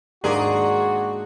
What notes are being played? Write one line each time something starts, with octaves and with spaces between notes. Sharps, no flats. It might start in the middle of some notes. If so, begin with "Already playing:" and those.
G#2 D#3 A#3 D4 F#4 G#4